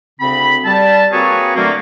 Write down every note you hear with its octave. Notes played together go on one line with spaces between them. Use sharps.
D2 C#3 C4 B5
G3 A5
A#3 C4 F#4 G#4 B4 C#5
D3 F#3 A3 A#3